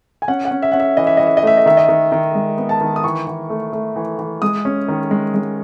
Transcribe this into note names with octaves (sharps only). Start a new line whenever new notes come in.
G#5
C#4 F#5
F#5
C#4
E5
C#4 F#5
E5
E3 D#5
E5
E3 D#5
E5
D#5
A3 E5
D#5
D#3 E5
D#5
D#3
D#3
G#3
B3
A5
D#3
D#6
E3 C#6
E3
A3
A3
E3
E3
G#3 D#6
C#4
D#3
G#3
G#3